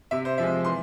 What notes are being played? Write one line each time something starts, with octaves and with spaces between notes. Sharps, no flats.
C3 E5
C5
F3 G#3 E5
E3 C6